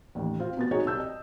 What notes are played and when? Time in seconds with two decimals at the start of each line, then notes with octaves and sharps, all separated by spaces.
0.15 A1 D#2
0.40 C4 F4
0.57 B2 B3 A6
0.71 D#4 F#4 G#4 C#5 D#5
0.85 C2 A5 E6 G6
1.00 D#5